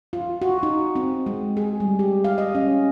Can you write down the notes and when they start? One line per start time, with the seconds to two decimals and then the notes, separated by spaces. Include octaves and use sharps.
0.13 F4
0.42 F#4
0.63 D#4
0.96 C4
1.26 G#3
1.57 G#4
1.80 G3
1.99 G4
2.24 F5
2.38 D#5
2.55 C#4